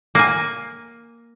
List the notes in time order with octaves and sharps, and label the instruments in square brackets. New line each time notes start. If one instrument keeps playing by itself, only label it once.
[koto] A#3 G#5